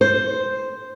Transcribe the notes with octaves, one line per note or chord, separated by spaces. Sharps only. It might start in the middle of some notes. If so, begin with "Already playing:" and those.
C5